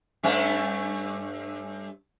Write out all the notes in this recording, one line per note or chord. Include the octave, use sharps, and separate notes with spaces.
G2 A3 C#4